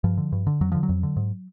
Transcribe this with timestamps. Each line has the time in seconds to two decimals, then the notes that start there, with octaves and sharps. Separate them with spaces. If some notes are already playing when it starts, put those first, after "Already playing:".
0.04 G2 F3
0.18 D3
0.32 G2
0.47 D3
0.61 F2 F#3
0.72 D3 F3
0.83 F#3
0.89 F2
1.03 D3
1.16 G#2